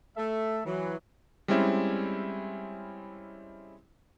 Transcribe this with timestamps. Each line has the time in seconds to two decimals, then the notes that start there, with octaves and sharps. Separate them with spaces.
0.17 A3 A4 E5
0.66 E3 F#3
1.48 G3 G#3 C4 C#4 E4